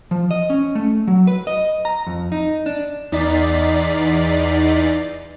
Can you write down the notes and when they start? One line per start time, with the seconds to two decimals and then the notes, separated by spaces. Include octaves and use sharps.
0.11 F3
0.31 D#5
0.50 C#4
0.75 A3
1.07 F#3
1.27 B4
1.47 D#5
1.85 A#5
2.07 F2
2.32 D#4
2.66 D4
3.12 E2 D#4 D5 A6 B6 C7